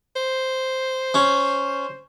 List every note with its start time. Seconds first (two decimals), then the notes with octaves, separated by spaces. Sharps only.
0.16 C5
1.14 C#4